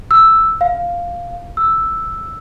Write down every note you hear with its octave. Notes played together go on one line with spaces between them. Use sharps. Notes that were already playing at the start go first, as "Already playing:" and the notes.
E6
F5
E6